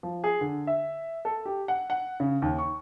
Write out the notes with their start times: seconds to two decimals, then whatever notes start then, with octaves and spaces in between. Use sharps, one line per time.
0.03 F3
0.24 G#4
0.41 D3
0.67 E5
1.25 A4
1.46 G4
1.68 F#5
1.90 F#5
2.20 C#3
2.42 D#2
2.59 C#6